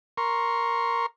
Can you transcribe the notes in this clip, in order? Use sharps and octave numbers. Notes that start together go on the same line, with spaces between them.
A#4 C6 C#6